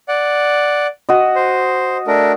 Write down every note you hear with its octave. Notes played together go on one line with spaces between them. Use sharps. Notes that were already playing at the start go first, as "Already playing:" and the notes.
D5 F#5
F#4 D#5
C5
A3 D4 A#4